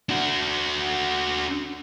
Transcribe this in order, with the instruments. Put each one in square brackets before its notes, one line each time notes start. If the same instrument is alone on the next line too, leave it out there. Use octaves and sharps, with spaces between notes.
[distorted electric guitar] D4 F#4